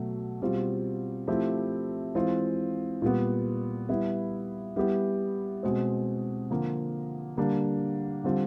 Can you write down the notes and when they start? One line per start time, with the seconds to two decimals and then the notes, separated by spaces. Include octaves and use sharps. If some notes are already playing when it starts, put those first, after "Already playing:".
Already playing: B2 F#3 A3
0.42 B2 G3 C4 F4
1.28 F3 A3 C4 E4 G4
2.15 E3 G#3 C4 F4
3.02 A#2 G3 B3
3.89 G3 B3 E4
4.76 G3 B3 E4 G4
5.63 B2 G#3 C4
6.50 D3 F3 A#3
7.37 D3 G3 A#3 D4
8.24 D3 G3 C4 F4